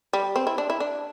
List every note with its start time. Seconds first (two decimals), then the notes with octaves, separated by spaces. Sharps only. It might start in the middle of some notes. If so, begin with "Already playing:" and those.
0.13 G3
0.36 C4
0.47 E4
0.58 D4
0.70 E4
0.80 D4